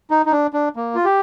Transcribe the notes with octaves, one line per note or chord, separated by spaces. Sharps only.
D#4
D#4
D4
D4
A#3
F4
G4